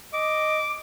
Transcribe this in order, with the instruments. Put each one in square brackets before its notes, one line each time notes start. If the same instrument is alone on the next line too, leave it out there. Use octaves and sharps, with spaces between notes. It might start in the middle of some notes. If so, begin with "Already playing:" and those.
[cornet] D#5 [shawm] D6